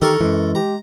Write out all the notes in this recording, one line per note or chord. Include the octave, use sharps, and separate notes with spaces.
D#3 G4 A4 A#4 A#5 C#6
F#2 E3 G#3
G4 A#5